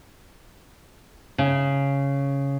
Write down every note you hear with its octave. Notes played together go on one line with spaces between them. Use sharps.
C#3